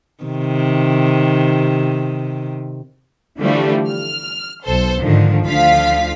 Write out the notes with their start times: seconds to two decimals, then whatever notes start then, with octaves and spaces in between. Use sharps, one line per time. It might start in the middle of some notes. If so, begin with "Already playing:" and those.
0.24 C3 D#3
3.38 D3 E3 F3 G3 A3 D4
3.89 F6
4.63 B1 A4 C5
5.01 G#2 D3 D#3 F3
5.45 D2 D3 F3 F4 F5 B6